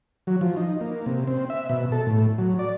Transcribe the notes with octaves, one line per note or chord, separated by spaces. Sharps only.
F#3
F3
D#4
A#3
C3
C4
E5
B2
A4
A2
F#3
D5